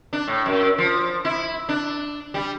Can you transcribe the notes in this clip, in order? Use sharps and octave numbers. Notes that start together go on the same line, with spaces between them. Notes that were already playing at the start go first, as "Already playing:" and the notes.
D4
A2
F#2
F3
E4
D4
G3